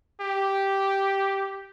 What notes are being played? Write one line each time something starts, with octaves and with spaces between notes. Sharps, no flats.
G4